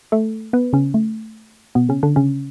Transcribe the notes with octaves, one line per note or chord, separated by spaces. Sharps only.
A3 A4
B3 B4
C#3 C#4
A3
B2 B3
C#3 C#4
D3 D4
C#3 C#4